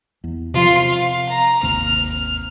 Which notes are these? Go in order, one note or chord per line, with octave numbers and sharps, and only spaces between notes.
E2
C3 F3 F4 C6
F5
A#5
G#1 D#2 C3 F6